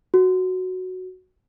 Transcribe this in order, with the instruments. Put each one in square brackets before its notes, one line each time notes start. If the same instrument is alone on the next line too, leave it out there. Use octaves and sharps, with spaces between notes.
[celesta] F#4